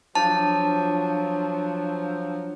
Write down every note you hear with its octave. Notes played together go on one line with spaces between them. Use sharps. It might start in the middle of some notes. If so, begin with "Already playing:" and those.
F3 F#3 D4 A5